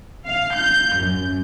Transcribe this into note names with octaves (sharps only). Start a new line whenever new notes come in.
F5
G6
F#2